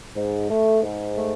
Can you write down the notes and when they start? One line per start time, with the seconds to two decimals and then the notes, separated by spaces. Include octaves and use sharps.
0.15 G#2
0.49 A3
0.83 G#2
1.16 A3